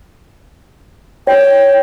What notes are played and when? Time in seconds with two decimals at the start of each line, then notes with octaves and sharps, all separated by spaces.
1.27 C#5 G5